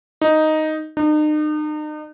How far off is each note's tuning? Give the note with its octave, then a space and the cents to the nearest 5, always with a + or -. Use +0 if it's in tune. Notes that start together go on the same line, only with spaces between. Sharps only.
D#4 +0
D#4 -40